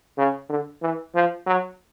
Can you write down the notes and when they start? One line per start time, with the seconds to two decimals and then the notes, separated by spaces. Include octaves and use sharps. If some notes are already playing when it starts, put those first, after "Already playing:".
0.18 C#3
0.50 D3
0.82 E3
1.15 F3
1.47 F#3